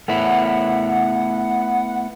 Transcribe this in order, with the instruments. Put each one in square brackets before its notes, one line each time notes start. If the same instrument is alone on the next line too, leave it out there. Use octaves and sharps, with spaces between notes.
[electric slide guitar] A3 B3 E4 [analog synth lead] F#5